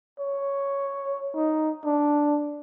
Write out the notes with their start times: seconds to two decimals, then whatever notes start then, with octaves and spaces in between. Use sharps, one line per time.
0.19 C#5
1.35 D#4
1.85 D4